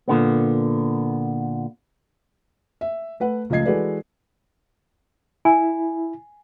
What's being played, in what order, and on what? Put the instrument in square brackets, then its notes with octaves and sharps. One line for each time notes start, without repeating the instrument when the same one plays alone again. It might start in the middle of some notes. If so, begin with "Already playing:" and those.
[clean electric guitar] A#2 D3 B3
[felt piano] E5
A3 B4 F#5
C#2 F3 A3 D#5 G#6 C7
E3 G#3 F#4 A4 B4 D5
[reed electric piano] E4 [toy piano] G#5